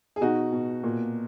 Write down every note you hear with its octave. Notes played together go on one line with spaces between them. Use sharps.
G#4
B2 D#4 F#4
B2
A#2